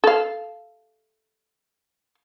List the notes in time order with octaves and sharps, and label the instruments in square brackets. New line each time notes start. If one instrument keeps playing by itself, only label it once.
[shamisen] A4 F5